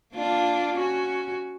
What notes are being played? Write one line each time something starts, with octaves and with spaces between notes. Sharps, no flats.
A#3 D4 F4
C#4 F#4